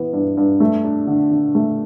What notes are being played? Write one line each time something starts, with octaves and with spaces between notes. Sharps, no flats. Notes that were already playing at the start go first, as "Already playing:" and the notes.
Already playing: E3 B3
G2
G2
A3
D4
D3
D3
A3